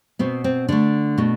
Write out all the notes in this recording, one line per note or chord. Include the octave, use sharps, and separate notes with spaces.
B2 B3 C4
C4
D3 A3 D4
B2 A3